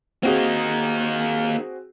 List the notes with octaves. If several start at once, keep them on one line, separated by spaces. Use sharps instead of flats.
A#3 C4 D#4 F#4 G#4